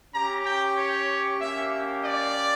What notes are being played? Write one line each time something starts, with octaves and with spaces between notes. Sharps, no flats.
C#4 G4 A#5
G5
C#5
A#3 C#4 G4 E5
D5